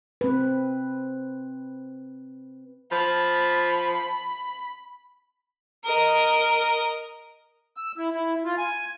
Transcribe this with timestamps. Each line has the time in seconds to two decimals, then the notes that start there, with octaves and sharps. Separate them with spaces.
0.21 C4 B4
2.92 F3 B5
5.84 A#4 D#5
7.77 E6
7.97 E4
8.13 E4
8.45 F4
8.58 G#5